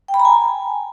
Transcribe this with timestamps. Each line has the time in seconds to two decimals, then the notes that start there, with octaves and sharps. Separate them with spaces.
0.08 G5
0.14 B5
0.20 A#5
0.25 G#5